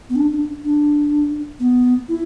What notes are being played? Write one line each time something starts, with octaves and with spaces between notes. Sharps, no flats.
B3
D4
D4
D4
B3
E4